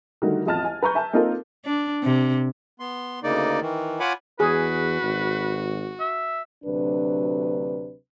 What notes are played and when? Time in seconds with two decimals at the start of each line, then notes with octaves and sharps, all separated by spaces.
0.22 D3 D#3 G3 A3 F#4 A#4
0.46 A1 F2 D#5 A5 F6 A6
0.64 G#5
0.82 B4 A#5 C#6 G6
0.95 E5 G#5 A5
1.13 A#3 C4 D#4 F4 A4 A#4
1.65 D4
2.04 C3
2.80 B3 C6
3.23 D2 C#3 A#3 D#4 D5
3.61 D#3 E3
4.00 F4 C#5 F#5 G#5 B5 D6
4.40 E2 F#4 G#4 B4
5.02 G#1
6.01 E5
6.65 D2 C3 F#3 D4 B4